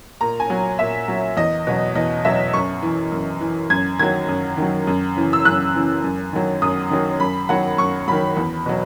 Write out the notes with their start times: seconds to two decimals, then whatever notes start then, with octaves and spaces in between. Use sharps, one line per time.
0.21 A#2 A#5
0.40 G#5
0.50 F#3
0.79 A#2 E5
1.08 F#3
1.37 E2 D#5
1.67 B2 F#3
1.95 E2 D#5
2.25 B2 F#3 E5
2.53 F#2 C#6
2.83 E3
3.12 F#2
3.41 E3
3.70 F#2 G#6
3.99 D#3 F#3 G#6
4.28 F#2
4.57 D#3 F#3
4.87 F#2
5.16 C#3 E3
5.33 E6
5.45 F#2 F#6
5.74 C#3 E3
6.03 F#2
6.33 D#3 F#3
6.62 F#2 D#6
6.91 D#3 F#3
7.20 F#2 B5
7.49 D#3 F#3 F#5
7.78 F#2 C#6
8.08 D#3 F#3 B5
8.37 E2
8.66 B2 F#3